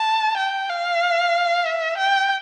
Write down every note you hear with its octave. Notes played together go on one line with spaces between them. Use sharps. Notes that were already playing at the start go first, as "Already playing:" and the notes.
Already playing: A5
G5
F5
E5
G5